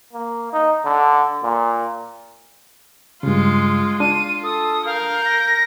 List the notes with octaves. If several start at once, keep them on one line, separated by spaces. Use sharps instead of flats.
A#3
D#4
D3
A#2
G2 C#3 G#3 F4
D4 F4 D#7
A4 D#6
A#4 F5 G6
A#6